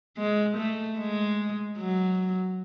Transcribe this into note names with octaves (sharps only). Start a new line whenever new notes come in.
G#3
A3
G#3
F#3